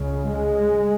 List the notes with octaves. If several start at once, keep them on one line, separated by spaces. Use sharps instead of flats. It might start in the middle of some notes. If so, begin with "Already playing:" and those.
Already playing: C#2 C#3
G#3